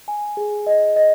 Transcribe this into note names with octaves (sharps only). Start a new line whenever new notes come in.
G#5
G#4
D#5
D#5